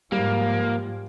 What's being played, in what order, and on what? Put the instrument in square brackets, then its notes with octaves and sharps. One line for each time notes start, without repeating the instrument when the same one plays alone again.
[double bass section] G#2 F3 [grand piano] G3 [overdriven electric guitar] A#3